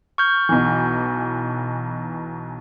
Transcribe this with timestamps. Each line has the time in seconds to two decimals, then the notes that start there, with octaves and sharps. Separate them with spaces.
0.18 C#6 F6 G6
0.49 B1 B2 E3